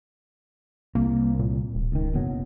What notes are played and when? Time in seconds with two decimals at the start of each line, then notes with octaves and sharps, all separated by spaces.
0.95 C2 A#3
1.39 A#2
1.75 D1
1.92 C#2 D#3
2.14 F#1 B2 F#3